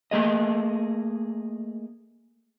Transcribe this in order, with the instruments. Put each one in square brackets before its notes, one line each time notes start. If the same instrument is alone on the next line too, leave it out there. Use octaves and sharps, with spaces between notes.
[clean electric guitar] A3 A#3 G#4 D#5